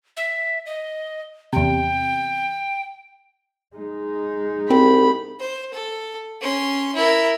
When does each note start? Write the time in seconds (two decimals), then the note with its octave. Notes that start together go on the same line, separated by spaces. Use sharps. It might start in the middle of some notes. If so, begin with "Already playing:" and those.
0.17 E5
0.66 D#5
1.53 E2 C3 G5
3.76 G#3 D#4
4.70 C2 C4 B5
5.40 C5
5.74 A4
6.41 C#4 C6
6.95 E4 A#4